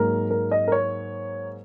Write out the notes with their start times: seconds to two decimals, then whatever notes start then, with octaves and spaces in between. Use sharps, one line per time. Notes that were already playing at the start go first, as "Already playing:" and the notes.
Already playing: G#2 F#3 A#3 A#4
0.31 A#4
0.52 D#5
0.68 A#4
0.72 C#5